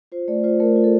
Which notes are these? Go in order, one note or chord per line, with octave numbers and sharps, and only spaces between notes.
F4 C5
A3 D5
F4 C5
A3 A#4
F4
A4